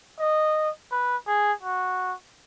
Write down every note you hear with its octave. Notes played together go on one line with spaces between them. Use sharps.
D#5
B4
G#4
F#4